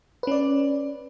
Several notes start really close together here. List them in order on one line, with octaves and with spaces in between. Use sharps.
B4 C#4 D5